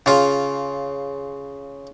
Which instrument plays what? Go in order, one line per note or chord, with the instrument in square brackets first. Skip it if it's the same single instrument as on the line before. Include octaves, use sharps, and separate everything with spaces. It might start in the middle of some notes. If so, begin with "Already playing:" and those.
[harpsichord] C#3 F4